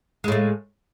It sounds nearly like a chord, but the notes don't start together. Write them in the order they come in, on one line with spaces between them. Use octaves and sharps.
G#3 A2 A3